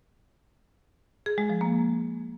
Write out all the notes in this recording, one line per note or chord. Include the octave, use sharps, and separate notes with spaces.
G#4
G#3
F3
A#3